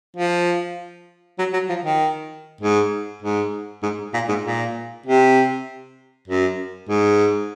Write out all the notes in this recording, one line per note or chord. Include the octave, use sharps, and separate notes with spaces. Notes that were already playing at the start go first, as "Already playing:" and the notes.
F3
F#3
F#3
F3
D#3
G#2
G#2
G#2
A#2
G#2
A#2
C3
F#2
G#2